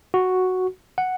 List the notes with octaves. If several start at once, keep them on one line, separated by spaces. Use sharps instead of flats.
F#4
F#5